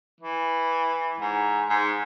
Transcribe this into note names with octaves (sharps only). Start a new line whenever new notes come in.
E3
G#2
G#2